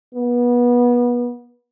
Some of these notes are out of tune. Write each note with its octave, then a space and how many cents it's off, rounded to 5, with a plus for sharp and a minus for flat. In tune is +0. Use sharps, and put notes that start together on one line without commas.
B3 -25